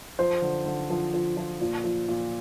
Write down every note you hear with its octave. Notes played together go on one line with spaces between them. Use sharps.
F3 C5
D3
D3
F3
F3
F3
A#2
F3
A#2